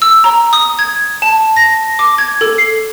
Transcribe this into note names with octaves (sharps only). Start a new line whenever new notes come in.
E6
A#5
D#6
G#6
A5
A#6
D6
G#6
A4
C7